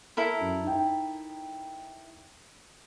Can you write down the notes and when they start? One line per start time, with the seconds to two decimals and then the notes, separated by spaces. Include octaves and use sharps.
0.17 E4 A4 A#4
0.40 F#2
0.64 D#4 G5